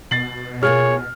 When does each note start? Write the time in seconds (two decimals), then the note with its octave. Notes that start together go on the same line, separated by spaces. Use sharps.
0.11 B2 A6 C7 F#7
0.63 A#3 F4 G#4 C#5 F6